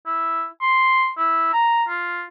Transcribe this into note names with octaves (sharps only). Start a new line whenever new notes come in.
E4
C6
E4
A#5
F4